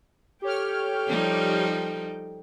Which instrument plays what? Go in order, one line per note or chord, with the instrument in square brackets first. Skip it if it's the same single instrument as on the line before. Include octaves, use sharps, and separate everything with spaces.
[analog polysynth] G4 C#5 F6 [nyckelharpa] A4 G5
[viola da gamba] F3 G3 D#4